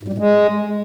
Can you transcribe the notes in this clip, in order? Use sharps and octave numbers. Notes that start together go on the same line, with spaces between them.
G#2
G3
A2
G#3